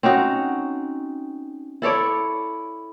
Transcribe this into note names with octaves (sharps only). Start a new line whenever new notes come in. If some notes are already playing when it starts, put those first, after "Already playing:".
C4 C#4 D#4 F#4
E4 A4 C#5 D5